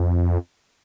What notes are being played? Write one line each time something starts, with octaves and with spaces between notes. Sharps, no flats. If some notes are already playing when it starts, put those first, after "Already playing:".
Already playing: F2